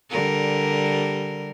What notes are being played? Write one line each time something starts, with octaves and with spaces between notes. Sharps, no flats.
D3 G3 A#4